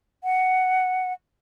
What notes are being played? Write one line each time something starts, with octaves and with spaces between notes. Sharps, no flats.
F#5